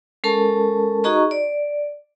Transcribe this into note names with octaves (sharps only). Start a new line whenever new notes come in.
G#3 C#4 A4 A#4 A5
D#4 F#4 G#4 D#5 A#5 C#6
D5